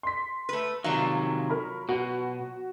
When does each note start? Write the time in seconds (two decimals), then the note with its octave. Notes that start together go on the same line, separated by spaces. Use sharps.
0.03 C6 B6
0.49 A3 B4
0.84 C3 D#3 F3 F#3 F5
1.50 A#4 B5
1.89 B2 F#4